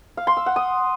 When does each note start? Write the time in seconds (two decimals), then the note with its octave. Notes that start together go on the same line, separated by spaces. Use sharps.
0.17 F5
0.27 C6
0.37 E6
0.46 F#5
0.56 D#6